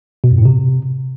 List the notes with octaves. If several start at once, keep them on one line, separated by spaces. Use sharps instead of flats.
B2
F#2
A2
C3